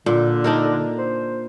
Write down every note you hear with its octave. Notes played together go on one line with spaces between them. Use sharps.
A#2 D3
D4 D#4 A#4
C5